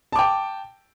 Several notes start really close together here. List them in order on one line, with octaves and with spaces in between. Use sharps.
A5 D6 G5